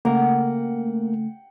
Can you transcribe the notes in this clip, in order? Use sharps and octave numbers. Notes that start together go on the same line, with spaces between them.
C#3 A3 A#3 A#4 F#5 G5